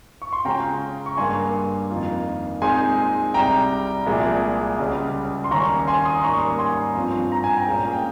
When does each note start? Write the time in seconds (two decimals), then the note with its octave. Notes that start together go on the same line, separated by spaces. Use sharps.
0.22 C#6
0.33 C6
0.45 C#3 G#3 C#4 F4 G5 A#5
1.06 C#6
1.17 G2 G3 A#3 G#5 C6
1.90 F2 D#3 A#3 F4
2.61 A#2 G#3 C4 D#4 G#5 C6
3.34 C2 C3 G3 G5 A#5
4.06 C2 A#2 F3 G#3
4.79 C#2 C#3 G3 C#4
5.44 C6
5.51 D#2 D#3 G3 C#4 A#5 C#6
5.87 G#5 C6
6.05 C6 D#6
6.23 G#2 G3 A#3 C#4 A#5 C#6
6.59 G#5 C6
6.95 G2 F3 C4 F4
7.32 A#5
7.44 G#5
7.57 G5 A#5
7.67 A#2 G#3 C#4 F4
7.93 G5